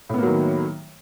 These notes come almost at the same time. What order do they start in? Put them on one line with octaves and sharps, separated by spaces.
A2 B3 A#3 F#3 D#3